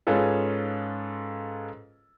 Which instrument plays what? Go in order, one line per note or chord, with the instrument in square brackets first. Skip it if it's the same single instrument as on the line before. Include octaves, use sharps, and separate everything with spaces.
[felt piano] G#2 C#4 F4 G#4 A4 B4